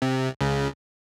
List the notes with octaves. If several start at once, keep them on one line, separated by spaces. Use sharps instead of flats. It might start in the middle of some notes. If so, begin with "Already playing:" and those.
C3
C#2 C#3